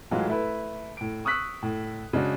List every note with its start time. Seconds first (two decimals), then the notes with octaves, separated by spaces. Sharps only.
0.11 A2 E3 F#3 G#3 F4
0.28 A3 E4 B4
0.97 A2 D7
1.25 C#6 D#6 E6 F#6 B6
1.63 A2
2.13 C#3 G#3 D4 F#4